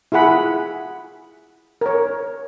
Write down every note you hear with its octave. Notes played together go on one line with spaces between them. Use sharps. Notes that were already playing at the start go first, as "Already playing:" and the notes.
E4 F4 G#4 F#5 B5
A#4 C#5